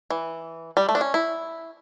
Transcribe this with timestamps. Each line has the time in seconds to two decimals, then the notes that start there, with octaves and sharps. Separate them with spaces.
0.10 E3
0.77 G3
0.89 A3
0.95 D4
1.01 C#4
1.14 E4